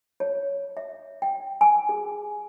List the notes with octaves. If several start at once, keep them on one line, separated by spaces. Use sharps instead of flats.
C#5
E5
G5
G#5
G#4